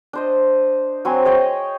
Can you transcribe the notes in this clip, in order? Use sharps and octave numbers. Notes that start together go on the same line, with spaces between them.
D4 C5 D#5
F#3 C4 G#5 C6
G#4 C#5 D#5 G5